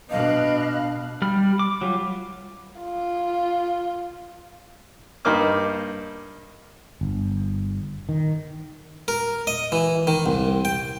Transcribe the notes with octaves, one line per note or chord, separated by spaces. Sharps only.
B2 B3 D4 D#5 F5 F#6
G3 B5 F6
D6
F#3 G3 F4
F4
G2 A#3 D#4 D6 F6
G1
D#3
A#4
D#5
E3
D#3
C2
G5